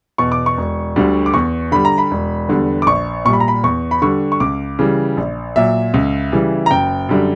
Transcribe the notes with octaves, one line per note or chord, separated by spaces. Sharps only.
E2 B2 C#6
D6
C#6
E1
D2 D3 G3
D6
E2 C#6
D3 G3 B5
A#5
B5
E1
E2 D3 G3
D6
A#1 C#6
A#2 G3 C#6
B5
A#5
B5
E2 C#6
B5
D3 G3 C#6
C#6
C#2 D6
C#3 E3 G3
A#1
A#2 F#3 E5
C#2
C#3 E3 G3
A#5
F#1 G5
F#2 D3 G3